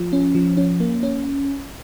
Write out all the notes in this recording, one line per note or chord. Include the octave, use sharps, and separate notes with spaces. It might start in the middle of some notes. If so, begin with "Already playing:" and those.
Already playing: F3
C#4
F3
C#4
A#3
C#4